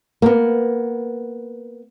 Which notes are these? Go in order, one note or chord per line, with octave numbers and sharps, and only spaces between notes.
A#3 B3